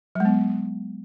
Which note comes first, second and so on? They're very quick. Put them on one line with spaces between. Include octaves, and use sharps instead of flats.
F#3 G#3 B3